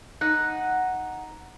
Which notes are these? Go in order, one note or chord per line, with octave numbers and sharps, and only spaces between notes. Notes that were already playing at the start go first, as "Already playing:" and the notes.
D#4 F#5